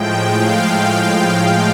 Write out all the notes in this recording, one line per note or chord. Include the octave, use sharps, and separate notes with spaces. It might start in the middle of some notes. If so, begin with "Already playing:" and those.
Already playing: A2 F3 G#3 G5
F5